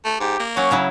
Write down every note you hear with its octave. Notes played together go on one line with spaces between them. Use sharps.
A3
G#2 G4
A#3
F#3 C#4 C#5
C#3 F#3 E4